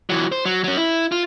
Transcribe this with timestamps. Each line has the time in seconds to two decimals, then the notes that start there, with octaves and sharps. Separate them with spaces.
0.10 E3 F#3
0.32 C5
0.45 F#3
0.64 F#3 C#4
0.77 E4
1.12 F4